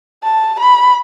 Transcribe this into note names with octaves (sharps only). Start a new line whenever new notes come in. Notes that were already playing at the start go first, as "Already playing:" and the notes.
A5
B5